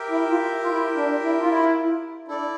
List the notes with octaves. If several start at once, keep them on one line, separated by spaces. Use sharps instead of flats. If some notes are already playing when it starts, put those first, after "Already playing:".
Already playing: G4 A#4 E5 G5
E4
F4
F4
E4
D4
E4
F4
E4
D4 E4 A4 D5